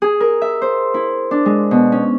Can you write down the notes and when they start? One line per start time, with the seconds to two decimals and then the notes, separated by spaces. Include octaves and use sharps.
0.02 G#4
0.20 A#4
0.42 E5
0.62 C5
0.94 E4
1.31 D4
1.46 G#3
1.71 B2
1.92 C#4